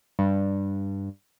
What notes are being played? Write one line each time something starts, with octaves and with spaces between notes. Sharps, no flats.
G2